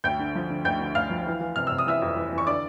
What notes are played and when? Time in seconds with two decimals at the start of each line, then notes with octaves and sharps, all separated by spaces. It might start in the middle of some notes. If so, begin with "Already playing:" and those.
0.04 D2 G5 G6
0.19 D3
0.35 F3
0.50 D3
0.65 D2 G5 G6
0.81 D3
0.95 D2 F5 F6
1.10 F3
1.26 E3
1.40 E3
1.56 C3 F6
1.67 C3 E6
1.78 D#6
1.86 E3 E5 E6
2.02 F2
2.16 E3
2.32 E3
2.38 C#6
2.46 D3 D5 D6